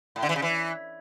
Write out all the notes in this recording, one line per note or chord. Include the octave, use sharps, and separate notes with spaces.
A2
D3
E3
C#3
E3